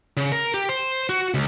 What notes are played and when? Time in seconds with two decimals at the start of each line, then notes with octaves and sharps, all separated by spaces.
0.17 C#3
0.32 A#4
0.54 G4
0.69 C5
1.09 F#4
1.34 C#2